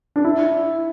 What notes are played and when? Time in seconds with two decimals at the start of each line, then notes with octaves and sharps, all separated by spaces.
0.16 D4
0.24 E4